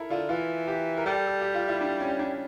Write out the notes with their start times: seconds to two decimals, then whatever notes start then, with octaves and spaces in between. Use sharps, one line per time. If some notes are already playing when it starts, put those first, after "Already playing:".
Already playing: E4 A4 A#4
0.10 D3 F4
0.29 E3 F4
0.68 G4
0.97 A#4
1.06 G3 A4
1.27 A4
1.41 G4
1.54 F4
1.68 E4
1.81 D4
2.00 C#4
2.19 D4